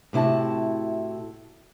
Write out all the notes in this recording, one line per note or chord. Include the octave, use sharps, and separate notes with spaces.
A2 C3 E4 F#4 A5